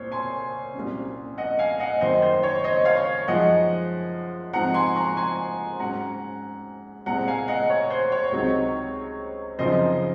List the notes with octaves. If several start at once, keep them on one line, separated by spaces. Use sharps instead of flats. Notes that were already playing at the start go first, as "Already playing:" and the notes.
Already playing: C2 A#2 A#3 C5 C#5
G#5 C6
C2 A#2 F#3 C#4
D#5 F#5
F5 G#5
D#5 F#5
F#2 D#3 A#3 C5 D#5
C5
C#5
C5 D#5
C#5 F5
F#2 F3 G#3 D#4 D#5 F#5
G#2 F3 C4 D#4 F#5 A#5
G#5 C6
A#5 C#6
G#5 C6
G#2 F#3 C#4 F#5 A#5
C2 A#2 G#3 C4 F#5 A#5
F5 G#5
D#5 F#5
C#5
C5
C#5
C#2 C3 F#3 C4 D#4
F#2 C#3 F3 C4 D#4 C5 D#5